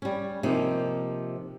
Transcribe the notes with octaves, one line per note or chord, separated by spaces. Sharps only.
G3 C#4
C3 F3 A#3 D#4